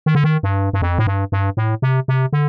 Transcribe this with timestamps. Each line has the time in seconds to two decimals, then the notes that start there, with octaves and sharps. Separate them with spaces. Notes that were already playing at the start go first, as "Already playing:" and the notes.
0.06 D#3
0.15 D3
0.24 D#3
0.43 G2
0.73 G2
0.82 F2
0.98 A2
1.07 G2
1.32 G2
1.57 A2
1.82 C3
2.08 C3
2.33 D3